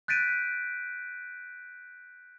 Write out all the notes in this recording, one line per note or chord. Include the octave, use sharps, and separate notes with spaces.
F#6 G6 A6 B6 D7 D#7